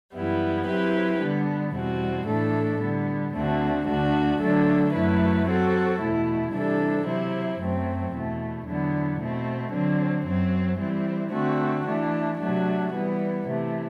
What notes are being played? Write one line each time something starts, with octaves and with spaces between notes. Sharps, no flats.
F#2 E3 G3 B3 E4
F#3 C4 E4 G4 B4
D3 G3 B3
E2 B2 G3 C4 F#4
A2 E3 A3 D4 A4
D3 G3 B3
D2 D3 A3 C4 F#4
D2 D3 A3 D4 F#4
D3 F#3 A3 D4 A4
F#2 F#3 A3 E4 B4
F#3 C4 F#4 A4
E2 B2 A3 E4
C3 E3 G3 D4 A4
C3 F#3 C4 E4
F#2 F#3 A3 C4
E2 B2 A3
E2 D3 F#3 B3
B2 A3 C4
D3 F#3 C4
F#2 F#3 C4
E3 G3 C4
D3 A3 C4 F#4
E3 A3 D4
C3 F#3 A3 D4 F#4
E3 G3 B3
C3 E3 A3